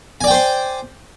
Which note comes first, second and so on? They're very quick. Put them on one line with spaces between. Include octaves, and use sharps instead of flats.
G#5 D5 G5 C5 C6